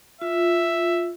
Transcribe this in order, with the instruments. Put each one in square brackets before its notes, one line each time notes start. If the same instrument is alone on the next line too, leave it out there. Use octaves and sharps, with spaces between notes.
[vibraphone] F4 [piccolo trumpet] E5